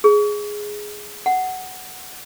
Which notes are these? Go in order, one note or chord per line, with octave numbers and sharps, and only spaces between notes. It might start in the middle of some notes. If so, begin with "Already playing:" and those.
G#4
F#5